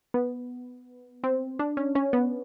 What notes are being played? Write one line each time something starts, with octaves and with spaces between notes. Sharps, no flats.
B3
C4
D4
C#4
C#4
B3